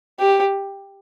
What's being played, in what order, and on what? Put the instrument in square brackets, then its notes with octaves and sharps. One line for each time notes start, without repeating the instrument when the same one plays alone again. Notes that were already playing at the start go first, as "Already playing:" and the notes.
[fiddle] G4